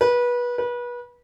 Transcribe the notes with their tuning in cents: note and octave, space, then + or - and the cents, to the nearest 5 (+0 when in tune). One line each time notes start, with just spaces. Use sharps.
B4 -25
B4 -30